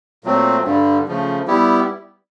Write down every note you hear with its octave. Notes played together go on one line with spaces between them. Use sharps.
A#2 F#3 A3 C4
G2 D3 G3
C#3 F3 A3
G3 B3 E4 G4